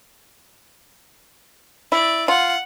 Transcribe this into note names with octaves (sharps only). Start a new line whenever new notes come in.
E4 D5
F4 F#5